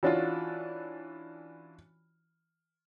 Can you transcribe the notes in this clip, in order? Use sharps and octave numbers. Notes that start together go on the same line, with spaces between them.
E3 C#4 D4 F4 F#4